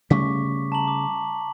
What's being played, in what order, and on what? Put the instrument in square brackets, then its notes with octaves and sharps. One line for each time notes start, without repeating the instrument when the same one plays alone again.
[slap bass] C#3 G3 A3 [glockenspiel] C#6 D6 B6
[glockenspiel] A5 A#5 F#7
D6